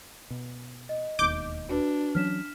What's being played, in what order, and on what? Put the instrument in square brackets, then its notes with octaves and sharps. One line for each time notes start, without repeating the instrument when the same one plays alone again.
[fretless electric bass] B2
[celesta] D#5
[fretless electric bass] E1 D#2 [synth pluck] D6 G6
[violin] D4 [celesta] F#4 B4
[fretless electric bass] E3 F#3 C#4 [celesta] F6 B6 E7